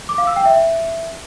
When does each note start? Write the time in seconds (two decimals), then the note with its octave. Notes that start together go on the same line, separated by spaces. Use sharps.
0.09 D6
0.18 F5
0.27 E6
0.36 G5
0.45 E5